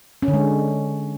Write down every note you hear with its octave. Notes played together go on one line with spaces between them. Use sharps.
C#4
D3
G#3